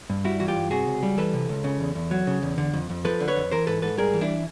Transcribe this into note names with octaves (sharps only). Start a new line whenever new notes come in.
G2
G3 E4 F#4
E3 F#4
F4 G4
G2
C3 F#4 G#4
C#2
G3
E3 A4 B4
C3
C#2
C#3
E2
E2
F#3
C#3
E2
D3
F2
F2
F3 A4 B4
D3
B4 C#5
F2
E3 A#4 C5
G#2 A4 B4
G#2 A4 B4
G3 G#4 A#4
E3
D4 E4